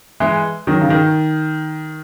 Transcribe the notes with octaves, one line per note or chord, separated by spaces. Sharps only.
E3 G#3
D#3 F#3
C#3
D#3